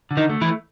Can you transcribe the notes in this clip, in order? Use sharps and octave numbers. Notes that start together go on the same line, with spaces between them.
D3
D#3 D#4
A3
E3 E4